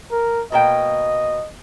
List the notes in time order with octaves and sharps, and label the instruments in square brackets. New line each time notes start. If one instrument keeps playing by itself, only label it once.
[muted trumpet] A#4
[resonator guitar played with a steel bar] B2 A#3 G5 [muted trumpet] D#5